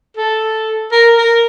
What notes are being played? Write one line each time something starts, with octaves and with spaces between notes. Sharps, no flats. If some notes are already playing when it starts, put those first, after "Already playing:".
A4
A#4
A#4